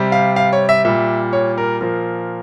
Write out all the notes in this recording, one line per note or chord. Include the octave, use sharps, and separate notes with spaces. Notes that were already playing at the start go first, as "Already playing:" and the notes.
Already playing: C3 G3
F5
F5
C#5
E5
A#2 G3 E5
C#5
A#4
A#2 F3 A#4